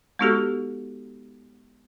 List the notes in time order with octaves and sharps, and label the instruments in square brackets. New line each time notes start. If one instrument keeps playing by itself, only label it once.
[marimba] G#3 B3 D#4 F#4 G4 A4